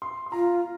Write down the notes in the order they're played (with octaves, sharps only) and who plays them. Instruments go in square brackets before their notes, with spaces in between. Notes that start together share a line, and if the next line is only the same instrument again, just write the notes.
[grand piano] C6
C6
[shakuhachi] F4 [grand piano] A#5